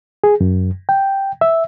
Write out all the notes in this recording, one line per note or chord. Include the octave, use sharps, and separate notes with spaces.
G#4
F#2
G5
E5